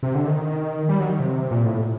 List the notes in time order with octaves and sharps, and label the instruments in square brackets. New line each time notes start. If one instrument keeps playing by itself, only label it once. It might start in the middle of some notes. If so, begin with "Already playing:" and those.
[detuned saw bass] C3
D3
D#3
G3
F#3
D#3
C3
A#2
A2